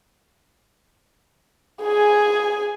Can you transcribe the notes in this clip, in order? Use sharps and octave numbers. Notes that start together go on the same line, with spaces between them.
G#4 G#5